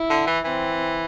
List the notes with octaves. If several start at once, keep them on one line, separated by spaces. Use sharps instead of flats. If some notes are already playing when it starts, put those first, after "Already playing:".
Already playing: E4
D3
E3
E3 C4